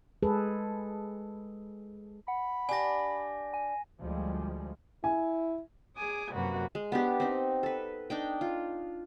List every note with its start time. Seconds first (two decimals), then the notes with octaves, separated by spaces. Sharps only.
0.23 G#3 G#4 A4 B4
2.28 F#5 B5
2.69 D4 G4 G#5 A#6
3.54 G#5
4.01 D2 F3 G3 G#3
5.04 E4 G#5
5.96 G#4 G#5 D6 D#6
6.33 F#2 C3 A#3 F#4 B4
6.75 G#3
6.92 B3 D4 G4
7.20 C4 D#4
7.63 A4 B4
8.10 D4 D#4 G5
8.41 F4